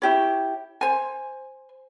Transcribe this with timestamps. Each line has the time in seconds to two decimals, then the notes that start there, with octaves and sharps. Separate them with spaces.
0.02 E4 G4 C#5
0.81 C5 G#5